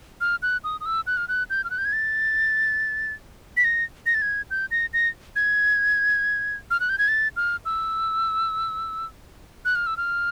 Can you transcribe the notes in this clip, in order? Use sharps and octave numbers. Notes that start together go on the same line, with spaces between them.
F6
F#6
D#6
D#6
E6
F#6
F6
F#6
G6
F6
F#6
G6
G#6
A6
B6
A#6
A#6
A6
G#6
G6
A#6
A#6
G#6
F6
F#6
G6
G#6
A6
F6
E6
F#6
F6
E6
F6